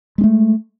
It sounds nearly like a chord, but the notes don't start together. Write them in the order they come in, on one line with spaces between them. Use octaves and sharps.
G#3 C#4 A3